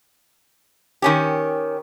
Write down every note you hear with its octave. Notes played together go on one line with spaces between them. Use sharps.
D#3 C#4 G4